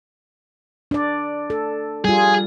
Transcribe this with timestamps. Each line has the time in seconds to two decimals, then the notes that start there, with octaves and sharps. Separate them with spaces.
0.91 D4 D5
1.50 A4
2.05 G3 F4 G#4